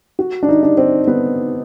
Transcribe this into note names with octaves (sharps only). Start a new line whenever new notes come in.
F#4
D4
D#4
D4
C4
B3